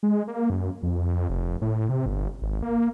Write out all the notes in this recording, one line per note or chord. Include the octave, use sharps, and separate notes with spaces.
G#3
A#3
F#2
F2
F1
A2
C3
G1
G#1
A#3